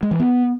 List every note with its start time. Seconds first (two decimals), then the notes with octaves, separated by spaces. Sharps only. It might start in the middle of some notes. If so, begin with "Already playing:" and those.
0.03 G#3
0.11 E3
0.20 B3